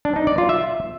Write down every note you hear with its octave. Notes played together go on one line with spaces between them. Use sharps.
D4
D#4
D5
F4
E5